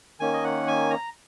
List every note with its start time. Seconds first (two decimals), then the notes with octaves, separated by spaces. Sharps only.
0.20 D#3 A#3 C#4 G#5
0.33 D#5
0.44 F#5
0.67 G#5
0.90 A#5